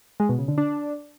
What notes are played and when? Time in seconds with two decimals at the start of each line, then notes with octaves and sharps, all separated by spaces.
0.20 G#3
0.29 B2
0.39 C#3
0.48 D3
0.58 D4